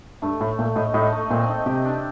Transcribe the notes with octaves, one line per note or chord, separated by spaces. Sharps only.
G2 A3
A2 A3
A#2 A3
A2 D#4
A2 D#4
A3
A#2 C4
D#4
C3 G4
D4